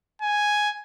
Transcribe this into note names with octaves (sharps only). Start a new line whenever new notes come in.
G#5